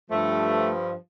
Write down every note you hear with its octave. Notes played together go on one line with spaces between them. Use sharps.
G2 F3 A3